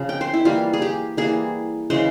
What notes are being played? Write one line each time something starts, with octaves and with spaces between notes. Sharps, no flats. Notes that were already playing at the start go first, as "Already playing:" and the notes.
Already playing: C#3 F3
G5
C5
E4
E3 G3 A#3 F4
G#4
G4
E3 G3 A#3 G#4
C#3 E3 G#3 C5